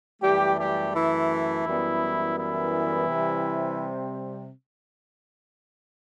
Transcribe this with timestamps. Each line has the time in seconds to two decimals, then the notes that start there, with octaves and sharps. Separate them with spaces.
0.22 F#2 E3 G3 A3 G4
0.58 G3 G4
0.94 E3 E4
1.65 F#2 E3 G3 B3
2.37 E3 E4
3.08 C3 G3 C4